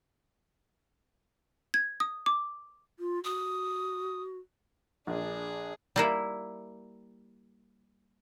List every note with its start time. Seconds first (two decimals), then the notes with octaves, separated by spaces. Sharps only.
1.74 G#6
2.00 D#6
2.26 D6
2.98 F4
3.24 F#4 D#6
5.07 A#1 D4 G#4
5.96 G3 A#3 E4